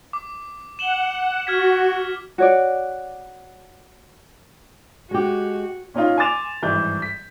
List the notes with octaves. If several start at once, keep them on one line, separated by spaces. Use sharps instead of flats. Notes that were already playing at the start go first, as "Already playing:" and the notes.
D6
F#5 E7 F#7 G7
F#4 F6 G#6 B6
F#4 C#5 D5
G#3 F#4 G4
A#2 C#4 D#4 F4
G#5 C6 D6 A6 E7 F7
G#1 G2 E3 E4 G6
B6